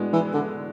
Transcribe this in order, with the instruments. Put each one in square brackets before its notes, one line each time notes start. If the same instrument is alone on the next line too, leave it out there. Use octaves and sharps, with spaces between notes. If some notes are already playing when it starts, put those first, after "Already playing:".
Already playing: [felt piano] A2 G#3 B3 D4 F#4
[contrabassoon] E3
D3